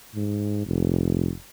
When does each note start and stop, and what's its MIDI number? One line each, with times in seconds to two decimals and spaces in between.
0.15 0.64 44
0.65 1.32 29